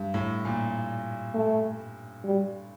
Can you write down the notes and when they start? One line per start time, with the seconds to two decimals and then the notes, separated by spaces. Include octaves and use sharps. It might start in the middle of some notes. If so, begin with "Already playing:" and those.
Already playing: G2
0.14 A2
0.45 A#2
1.34 A3
2.24 G3